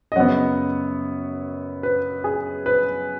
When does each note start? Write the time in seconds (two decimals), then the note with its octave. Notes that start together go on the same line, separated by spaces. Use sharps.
0.12 D#5
0.16 F#2 C#3 B3 C#5 F#5
1.83 B4
2.24 G#4
2.66 B4